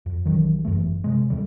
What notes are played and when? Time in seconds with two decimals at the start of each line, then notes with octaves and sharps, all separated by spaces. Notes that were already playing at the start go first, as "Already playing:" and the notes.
0.06 F2
0.26 B1 D#3 E3 F#3
0.65 G1 F#2 E3 A3
1.04 C3 G#3
1.30 E2 D3 G3